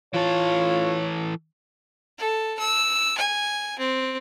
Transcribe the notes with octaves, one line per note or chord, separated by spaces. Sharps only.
E3 F4 A4 C#5
A4
E6
G#5
C4